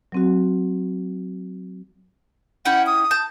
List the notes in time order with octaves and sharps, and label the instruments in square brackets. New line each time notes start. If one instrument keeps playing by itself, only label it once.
[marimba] F#3 C4 F#4
[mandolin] C#4 E4 G5 [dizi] F#5
[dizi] D#6
[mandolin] A5 G6